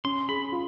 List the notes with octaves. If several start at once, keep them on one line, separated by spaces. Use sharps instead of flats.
C#4 C6
G#4 B5
F4